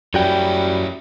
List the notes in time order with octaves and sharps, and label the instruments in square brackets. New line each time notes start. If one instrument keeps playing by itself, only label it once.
[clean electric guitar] F#2 F#4 G5 [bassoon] G3 [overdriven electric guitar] C#4 E4